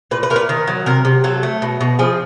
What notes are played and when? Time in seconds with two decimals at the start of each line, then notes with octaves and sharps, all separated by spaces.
0.11 A#2 B4
0.23 B4
0.30 A#2 A#4
0.36 B4
0.49 D#3 A#4
0.67 F#3
0.86 C3 A#4
1.05 C3
1.24 F#3 A4
1.43 A3
1.62 B2
1.81 B2
1.99 F3 G#4